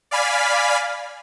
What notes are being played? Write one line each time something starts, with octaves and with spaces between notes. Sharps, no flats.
D5 F5 G#5 B5 F6 B6